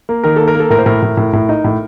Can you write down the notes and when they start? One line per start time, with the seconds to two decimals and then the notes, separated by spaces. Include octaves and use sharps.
0.09 A#3
0.24 D#3 A#4
0.36 A#3 A4
0.48 A#4
0.55 A#3
0.60 A4
0.70 A2 A#4
0.79 C5
0.86 A2 A#4
1.02 A2
1.17 A2
1.33 A2
1.49 D#4
1.64 A2